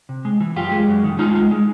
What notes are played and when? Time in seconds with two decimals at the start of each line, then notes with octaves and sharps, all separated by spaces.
0.09 C3
0.25 G#3
0.40 E3
0.56 F#2 F4 G4
0.71 G#3
0.88 F#2
1.04 D#3
1.19 G#3 D#4 F4
1.35 G#3
1.51 G#3